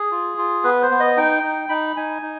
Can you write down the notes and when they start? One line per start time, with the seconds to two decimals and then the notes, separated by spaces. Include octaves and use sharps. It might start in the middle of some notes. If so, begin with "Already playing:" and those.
Already playing: G#4
0.11 F4
0.38 F4
0.64 B3 B4
0.82 C5
0.91 B3
1.00 D#5
1.17 D#4 G5
1.43 D#4
1.69 D#4 B5
1.96 D#4 G#5
2.22 D#4